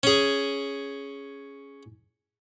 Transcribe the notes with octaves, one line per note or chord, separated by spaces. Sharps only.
C#4 G#4